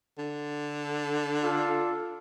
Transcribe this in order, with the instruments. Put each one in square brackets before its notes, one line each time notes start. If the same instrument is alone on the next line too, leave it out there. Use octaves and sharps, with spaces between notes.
[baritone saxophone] D3
[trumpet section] D4 F4 A4